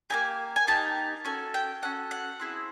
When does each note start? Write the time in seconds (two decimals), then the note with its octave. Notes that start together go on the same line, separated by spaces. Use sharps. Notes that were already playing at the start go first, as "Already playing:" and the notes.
0.10 A#3 D#4 G4 G#5
0.56 G#5
0.67 A#3 D#4 G4 A5
1.25 C#4 F#4 A4 G#5
1.54 G5
1.82 C#4 F#4 A4 F#5
2.11 F#5
2.40 C4 E4 G#4